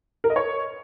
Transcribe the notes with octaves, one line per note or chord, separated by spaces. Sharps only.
A#4
D#5
C#5